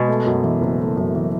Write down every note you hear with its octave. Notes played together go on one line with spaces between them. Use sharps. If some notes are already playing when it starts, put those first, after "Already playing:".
Already playing: B2 G#3 B3
A3
F#2
E3
F#1
A3
F#2
E3